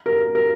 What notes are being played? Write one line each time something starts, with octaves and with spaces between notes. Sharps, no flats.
A#4
A#4